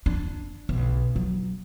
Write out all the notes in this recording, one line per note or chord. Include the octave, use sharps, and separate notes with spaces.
D4
B1
F#3